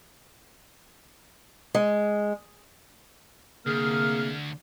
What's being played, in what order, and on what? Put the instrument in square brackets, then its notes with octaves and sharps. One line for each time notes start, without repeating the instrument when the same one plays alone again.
[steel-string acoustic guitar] G#3
[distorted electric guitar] D2 [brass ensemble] C3 A#3 [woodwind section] G#4 F6